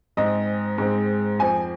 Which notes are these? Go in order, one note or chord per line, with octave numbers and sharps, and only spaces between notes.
G#2 G#3 C4 D#5
G#2 G#3 C4
F2 F3 C4 G#5